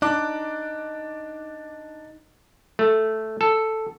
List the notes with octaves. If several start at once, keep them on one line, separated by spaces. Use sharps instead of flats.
D4 D#4 D6 F#6
A3
A4